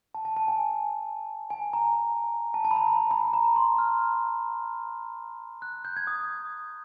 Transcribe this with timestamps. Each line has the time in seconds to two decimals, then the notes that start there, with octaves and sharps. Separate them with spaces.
0.15 A5
0.25 A5
0.37 A5
0.48 G#5
1.50 G#5
1.73 A#5
2.54 A5
2.65 A5
2.71 B5
2.76 A#5
2.87 B5
3.11 B5
3.33 A#5
3.56 C6
3.78 F6
5.62 F#6
5.85 G6
5.96 G#6
6.07 D#6